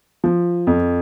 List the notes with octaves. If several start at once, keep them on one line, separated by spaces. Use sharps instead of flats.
F3
F2